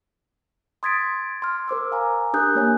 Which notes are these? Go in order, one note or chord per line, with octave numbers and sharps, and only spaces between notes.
C6 D#6 G#6 A6 B6 D7
C6 F6
A#4 C5 D6 E6
F5 G#5 A#5
D4 G4 A#4 D#6 F#6 G6
A#3 C#5 G#5